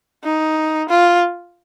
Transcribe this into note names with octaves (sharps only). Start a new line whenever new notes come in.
D#4
F4